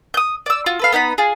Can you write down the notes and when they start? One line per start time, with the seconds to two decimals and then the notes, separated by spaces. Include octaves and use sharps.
0.14 D#6 G6
0.46 D5 E6
0.66 F4 F#4
0.79 A4 B4 F5
0.92 B3 D#4 G5 B5
1.18 F4 G#4